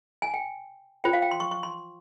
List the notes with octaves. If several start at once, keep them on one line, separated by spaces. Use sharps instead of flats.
G#5
G5
F4 C5 G5
F5
G5
C6
C#6
C#6
C6